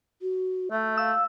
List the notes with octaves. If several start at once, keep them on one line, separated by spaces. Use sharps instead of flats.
F#4
A3 E5
F5 E6